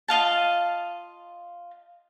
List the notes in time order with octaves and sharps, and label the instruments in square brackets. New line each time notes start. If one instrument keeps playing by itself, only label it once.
[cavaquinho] F4 D#5 F5 A5